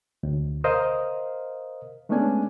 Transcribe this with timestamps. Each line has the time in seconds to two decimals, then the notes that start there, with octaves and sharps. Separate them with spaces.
0.23 D2
0.64 A#4 C5 D#5 F5 D#6
2.09 G#3 A3 B3 C#4 D4 G#5